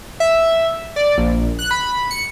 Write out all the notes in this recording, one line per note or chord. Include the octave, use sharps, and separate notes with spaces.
E5
D5
A#1
F#6
B5
C#7